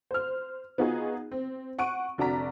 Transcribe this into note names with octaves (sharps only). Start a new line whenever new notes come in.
C5 F6
B3 D#4 F4 F#4 G#4
C4
F#5 C#6 D7 D#7
F1 D4 F#4 D5 A#5 B6